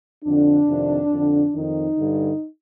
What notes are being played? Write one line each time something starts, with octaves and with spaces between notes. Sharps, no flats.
F2 D3 D4
F2 C3 D#3
F2 D3
F2 D#3 D#4
G2 D3